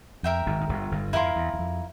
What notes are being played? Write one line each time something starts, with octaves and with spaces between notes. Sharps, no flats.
F2 A#4 E5 G5
G#1 G#2
G#2
G1 G2
G1 G2
G2
F2 E4 A#4 F5 C6
E2
E2
F2